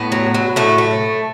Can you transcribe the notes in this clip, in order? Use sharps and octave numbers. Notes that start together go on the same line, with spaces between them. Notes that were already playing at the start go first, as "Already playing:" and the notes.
Already playing: A2 B3
F#3
F#3
A2 A3
A3